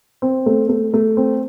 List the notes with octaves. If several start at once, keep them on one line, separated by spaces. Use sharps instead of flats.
C4
A3
A3
A3
C4